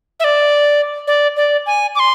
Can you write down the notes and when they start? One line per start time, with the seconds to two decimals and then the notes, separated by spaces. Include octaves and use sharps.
0.20 E5
0.24 D5
1.07 D5
1.37 D5
1.66 G#5
1.95 D6
1.99 C6